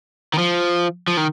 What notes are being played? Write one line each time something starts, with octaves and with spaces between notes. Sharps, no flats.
D#3
F3
F3
D#3